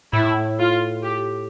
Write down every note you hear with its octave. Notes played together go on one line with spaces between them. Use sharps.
A2 E4
F4
G4